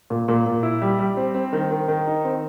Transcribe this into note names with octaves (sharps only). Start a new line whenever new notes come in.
A#2
A#2
A#2
E4
G3
G3
C4
C4
D#3
D#3
D#3
D#4
C4